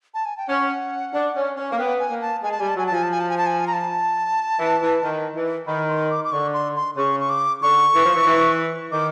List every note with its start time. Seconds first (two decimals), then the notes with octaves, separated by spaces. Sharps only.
0.14 A5
0.26 G#5
0.37 G5
0.49 C#4 F#5
1.13 D4
1.34 C#4
1.57 C#4
1.72 A#3
1.79 B3 G5
2.00 G#5
2.10 A#3
2.21 A5
2.43 G#3 G#5
2.52 A5
2.59 G3 G#5
2.69 A5
2.76 F#3 G#5
2.87 A5
2.91 F3 G#5
3.03 A5
3.11 G#5
3.20 A5
3.29 G#5
3.38 A5
3.46 G#5
3.67 A#5
3.73 A5
4.59 E3
4.80 E3
5.03 D#3
5.35 E3
5.67 D#3 B5
5.89 C6
6.11 D6
6.25 D6
6.32 D3 C#6
6.53 C6
6.76 C6
6.97 C#3 C#6
7.20 C#6
7.29 D6
7.62 D3 C#6
7.94 E3
8.04 F3
8.15 E3
8.26 E3
8.92 D#3 D6